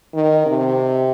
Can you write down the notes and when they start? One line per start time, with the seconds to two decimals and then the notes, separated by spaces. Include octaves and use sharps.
0.13 D#3
0.46 C3